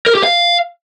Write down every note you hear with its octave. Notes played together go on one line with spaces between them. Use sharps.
A#4
G4
F5